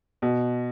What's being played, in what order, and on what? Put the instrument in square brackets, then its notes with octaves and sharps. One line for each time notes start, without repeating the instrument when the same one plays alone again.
[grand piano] B2